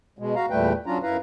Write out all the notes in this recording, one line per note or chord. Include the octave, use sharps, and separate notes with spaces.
B2 G#3
F#4 F5 A#5
E2 A#2 G3 A3 B4 G5
F#3 C#4 D4 F4 A#5
F#2 E4 B4 F5 A#5